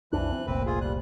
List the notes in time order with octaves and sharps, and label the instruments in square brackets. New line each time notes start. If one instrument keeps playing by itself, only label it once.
[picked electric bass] B1 F2 D4 [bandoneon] E3 F#6
[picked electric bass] C4
[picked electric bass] F1 C2 A#2 [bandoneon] C4 B4
[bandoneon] F4 G#4
G3 F#6